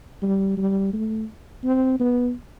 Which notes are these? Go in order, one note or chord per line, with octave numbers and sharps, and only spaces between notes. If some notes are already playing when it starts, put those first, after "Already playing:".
G3
G3
A3
C4
B3